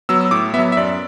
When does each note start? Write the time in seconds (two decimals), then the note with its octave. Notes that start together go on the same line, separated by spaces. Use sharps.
0.09 F#3 B3 E6
0.21 E6
0.31 A2 D6
0.54 B3 E5
0.58 F#3
0.72 E5
0.77 F#2 D5